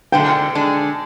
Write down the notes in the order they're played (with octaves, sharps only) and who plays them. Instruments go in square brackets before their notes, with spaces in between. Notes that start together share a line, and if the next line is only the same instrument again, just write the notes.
[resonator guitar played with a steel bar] D3 G#3 D4 [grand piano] G5
[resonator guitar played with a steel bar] D3 G#3 D4